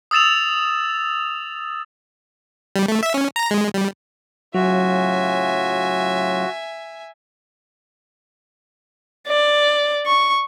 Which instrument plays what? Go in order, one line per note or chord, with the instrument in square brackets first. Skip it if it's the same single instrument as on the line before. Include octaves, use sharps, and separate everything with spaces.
[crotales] D#6 E6 A6 E7 F7
[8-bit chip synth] G3
A3
E5
C#4
A#5
G#3
G3
[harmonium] A2 C#3 F4 [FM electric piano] F#3 [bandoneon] F#4 [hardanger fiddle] E5 G#5
[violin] D5
C#6